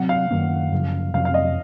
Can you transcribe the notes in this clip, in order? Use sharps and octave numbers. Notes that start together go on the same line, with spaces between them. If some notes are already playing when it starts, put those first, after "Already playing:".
Already playing: C3 F#3 C4 F#5
F5
F#2 D#3 A#3 C#4
F#2 C#3 F3
F2 C3 F#3 C#4 F5
F5
D#5